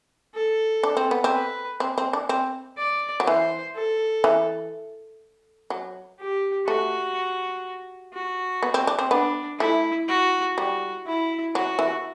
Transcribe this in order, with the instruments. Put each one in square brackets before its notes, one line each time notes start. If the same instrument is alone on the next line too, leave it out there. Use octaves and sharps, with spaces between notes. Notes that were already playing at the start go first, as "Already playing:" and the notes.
[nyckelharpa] A4
[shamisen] D4
C4
B3
C4
[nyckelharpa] B4
[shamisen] C4
C4
D4
C4
[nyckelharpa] D5
[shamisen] F#3
[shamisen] E3 [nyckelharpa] C5
[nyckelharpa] A4
[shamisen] E3
F#3
[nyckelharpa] G4
[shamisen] A3 [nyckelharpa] F#4
[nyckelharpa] F#4
[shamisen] B3
C4
D4
C4
[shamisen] B3 [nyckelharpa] D4
[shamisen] A3 [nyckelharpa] E4
[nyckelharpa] F#4
[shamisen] G3 [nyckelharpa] F#4
[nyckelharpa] E4
[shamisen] F#3 [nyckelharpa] F#4
[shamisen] E3